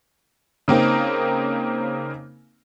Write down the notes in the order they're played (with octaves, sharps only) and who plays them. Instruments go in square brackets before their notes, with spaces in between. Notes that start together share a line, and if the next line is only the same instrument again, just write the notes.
[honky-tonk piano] C#3 A#3 C4 D#4 A#4